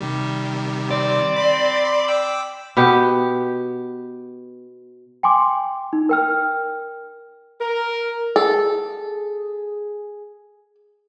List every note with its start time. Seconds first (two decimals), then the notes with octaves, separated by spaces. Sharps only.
0.01 C3 D#3 G3
0.91 C4 D5
1.36 B5 C6
2.08 G5 D6 E6
2.77 B2 B3 G4
5.23 G5 G#5 C6 D6
5.93 D#4
6.09 A#4 G5 F6
7.61 A#4
8.36 G#4 A4